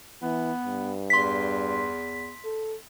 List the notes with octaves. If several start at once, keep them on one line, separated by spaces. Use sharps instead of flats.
E3 B3
G2
E2 C6 B6
A4